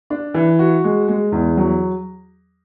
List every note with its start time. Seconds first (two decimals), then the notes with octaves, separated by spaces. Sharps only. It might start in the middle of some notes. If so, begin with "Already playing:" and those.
0.10 D4
0.34 E3
0.59 F#4
0.84 G#3
1.08 G#3
1.32 E2
1.57 F#3